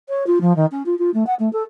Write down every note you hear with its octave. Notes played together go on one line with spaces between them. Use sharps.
C#5
F4
F3
D#3
C#4
F4
F4
A3
F#5
A3
A4